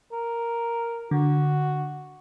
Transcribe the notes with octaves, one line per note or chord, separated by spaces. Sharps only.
A#4
D3 F#4